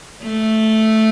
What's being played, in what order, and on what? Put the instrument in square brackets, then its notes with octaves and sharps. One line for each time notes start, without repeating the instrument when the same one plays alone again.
[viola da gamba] A3